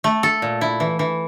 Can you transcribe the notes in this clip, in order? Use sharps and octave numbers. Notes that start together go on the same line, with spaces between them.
A3
A4
A#2
E4
E3
E3